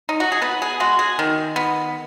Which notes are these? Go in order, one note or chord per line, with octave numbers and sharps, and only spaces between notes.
D#4
F#4
G#4
B3 B4
G#4
G#3 F#4
G#4
D#3
B3